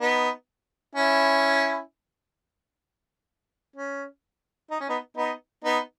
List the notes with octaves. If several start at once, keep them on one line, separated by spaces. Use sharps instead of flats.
B3 D#4
C#4 E4
C#4
D#4
C#4
B3 D#4
B3 D#4
B3 D#4